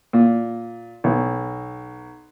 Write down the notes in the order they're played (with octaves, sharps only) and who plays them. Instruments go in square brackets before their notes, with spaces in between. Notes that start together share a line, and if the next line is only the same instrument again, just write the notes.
[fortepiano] A#2
B1